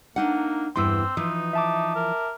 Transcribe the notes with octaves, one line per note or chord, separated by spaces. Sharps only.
A#3 D4 D#4 F#5
E2 G2 C4 E4 C6 D6 E6
E3 F3 D#4
E5 A5 D6
A#4